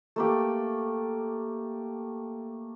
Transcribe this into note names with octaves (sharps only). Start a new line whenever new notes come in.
A3 A#3 G4